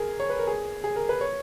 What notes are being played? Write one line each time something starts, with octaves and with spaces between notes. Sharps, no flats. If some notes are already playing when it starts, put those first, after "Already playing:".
Already playing: G#4 A#4
C#5
B4
A#4
G#4
G#4
A#4
B4
C#5